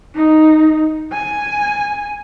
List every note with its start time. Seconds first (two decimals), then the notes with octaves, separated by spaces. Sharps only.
0.15 D#4
1.12 G#5